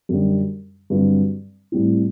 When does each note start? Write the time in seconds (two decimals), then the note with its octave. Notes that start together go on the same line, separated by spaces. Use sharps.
0.09 F#2 D3 G3
0.90 G2 D3 F#3 C4
1.72 A2 G3 C4 E4